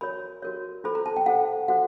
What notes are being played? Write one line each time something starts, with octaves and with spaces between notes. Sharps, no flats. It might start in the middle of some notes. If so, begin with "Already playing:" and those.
F#4 A#4 C#5 B5
F#4 A#4 C#5
F4 A4 C5 B5
A#5
A5
G5
F4 A4 C5 F#5
F#4 A4 C5 F#5